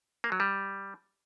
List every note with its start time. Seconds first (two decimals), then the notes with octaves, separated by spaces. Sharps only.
0.24 A#3
0.32 F#3
0.40 G3